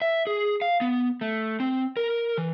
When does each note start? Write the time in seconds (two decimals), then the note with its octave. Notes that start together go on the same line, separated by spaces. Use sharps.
0.02 E5
0.27 G#4
0.62 F5
0.81 B3
1.21 A3
1.60 C4
1.97 A#4
2.38 E3